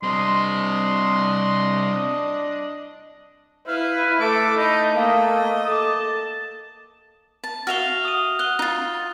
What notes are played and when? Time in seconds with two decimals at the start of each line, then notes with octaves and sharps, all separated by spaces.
0.03 G3 C4 D4 D#5 C6
3.68 E4 B4 F5
4.20 A3 A4 D6
4.57 D#4 D#5 B5
4.97 A#3 D#5 F5
5.67 A4 A5 D6
7.44 A5
7.67 F#4 E5 F5 F6 F7 G7
8.05 D#6 D#7
8.39 F#5 F#6 G7
8.59 D#4 F4